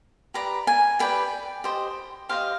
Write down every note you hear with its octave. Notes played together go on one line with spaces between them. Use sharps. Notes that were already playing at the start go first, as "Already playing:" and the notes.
G4 B4 D5 A#5
G#5
G4 B4 D5 G5
G4 C5 D#5
G4 C5 D#5 F5